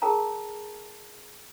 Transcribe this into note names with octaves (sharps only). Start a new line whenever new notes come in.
G#4 A#4 G5 A5 A#5